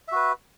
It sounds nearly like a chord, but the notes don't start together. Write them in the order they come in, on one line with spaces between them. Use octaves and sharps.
E5 F#4 B4